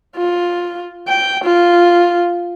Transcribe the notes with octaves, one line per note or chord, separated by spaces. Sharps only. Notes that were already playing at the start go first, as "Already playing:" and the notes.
F4
G5
F4